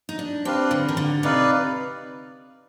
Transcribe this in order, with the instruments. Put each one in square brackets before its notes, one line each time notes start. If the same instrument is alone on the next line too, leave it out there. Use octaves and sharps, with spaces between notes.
[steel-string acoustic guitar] D#4
D4
[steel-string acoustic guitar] C4 [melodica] D4 G4 B4 F5
[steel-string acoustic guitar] D3
D#3
D3
[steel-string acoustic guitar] C3 [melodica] D#4 B4 D5 F5